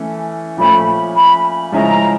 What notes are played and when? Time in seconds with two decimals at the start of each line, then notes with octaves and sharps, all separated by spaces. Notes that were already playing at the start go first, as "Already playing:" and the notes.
Already playing: E3 A3 C#4 A4
0.57 A#2 F3 A3 C#4 B5
1.15 B5
1.72 C#3 F3 G#3 C#4 E4 A#5